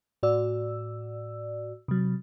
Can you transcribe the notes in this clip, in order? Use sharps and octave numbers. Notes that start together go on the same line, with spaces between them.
A2 F#4 D5 E6
C3 F#3